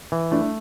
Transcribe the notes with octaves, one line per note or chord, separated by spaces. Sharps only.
E3
A3 D4 E4